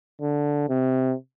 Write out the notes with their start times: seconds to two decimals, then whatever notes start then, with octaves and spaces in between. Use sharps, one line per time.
0.21 D3
0.69 C3